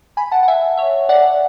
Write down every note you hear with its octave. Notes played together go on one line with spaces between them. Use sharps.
G#5 B5
F#5 A5
F#5
E5 G#5
C#5 E5
D5 F#5